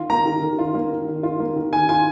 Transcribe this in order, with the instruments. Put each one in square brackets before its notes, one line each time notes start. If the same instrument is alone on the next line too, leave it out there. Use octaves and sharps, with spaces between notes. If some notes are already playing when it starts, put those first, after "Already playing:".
Already playing: [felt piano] D#3 F4
[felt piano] A#3 [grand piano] A#5
[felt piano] D#3
D#3
F4
A#3
D#3
D#3
F4
A#3
D#3
[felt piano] D#3 [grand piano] G#5
[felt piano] F4 [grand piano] G#5